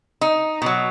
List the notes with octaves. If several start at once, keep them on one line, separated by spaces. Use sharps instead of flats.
D#4
B2 F#3